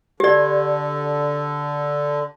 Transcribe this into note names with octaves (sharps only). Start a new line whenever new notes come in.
D3 G4 D5